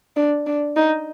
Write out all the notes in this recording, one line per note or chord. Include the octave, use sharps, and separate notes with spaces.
D4
D4
D#4